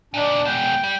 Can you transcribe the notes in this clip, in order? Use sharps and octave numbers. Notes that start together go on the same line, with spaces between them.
A#2 D4 D#4
B2 G#3 G5
G3